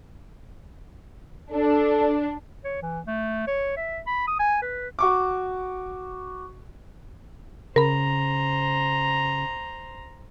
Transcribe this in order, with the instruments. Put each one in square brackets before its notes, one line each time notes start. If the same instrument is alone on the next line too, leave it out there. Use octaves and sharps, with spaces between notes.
[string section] D4 [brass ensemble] A4
[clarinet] C#5
E3
A3
C#5
E5
B5
D#6
G#5
B4
[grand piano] F#4 C#6 D6
[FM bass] C#3 [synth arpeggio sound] A#4 B5 [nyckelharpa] C5 A#5